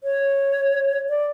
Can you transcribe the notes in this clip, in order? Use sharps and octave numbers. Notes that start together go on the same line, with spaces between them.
C#5
D5